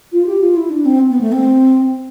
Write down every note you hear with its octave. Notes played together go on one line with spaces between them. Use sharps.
F4
G4
F4
E4
D4
C4
B3
A3
C4